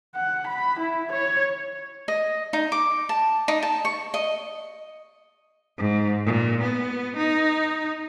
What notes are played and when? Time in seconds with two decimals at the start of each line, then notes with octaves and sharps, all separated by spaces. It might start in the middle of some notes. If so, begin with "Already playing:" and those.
0.16 F#5
0.47 B5
0.79 E4
1.11 C#5
2.08 D#5
2.53 D#4
2.72 D6
3.09 A5
3.48 D#4
3.62 A5
3.85 C#6
4.14 D#5
5.78 G#2
6.26 A#2
6.62 B3
7.17 D#4